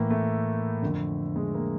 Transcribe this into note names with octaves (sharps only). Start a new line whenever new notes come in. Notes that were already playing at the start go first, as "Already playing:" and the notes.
Already playing: A2 E3 A#3
A3
F2 D3
G#3
A#3